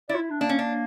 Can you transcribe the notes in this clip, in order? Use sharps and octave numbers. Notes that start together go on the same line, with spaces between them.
E4 D5
F4
E4
D4
A#3 D4
C#4
D4